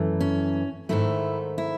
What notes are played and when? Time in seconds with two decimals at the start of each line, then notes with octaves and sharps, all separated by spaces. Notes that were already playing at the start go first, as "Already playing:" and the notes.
Already playing: F#2 E3 A3
0.20 C#4
0.89 G#2 D#3 A3 E4
1.58 E4